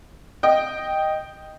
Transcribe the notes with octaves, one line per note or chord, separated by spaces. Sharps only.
D#5 G5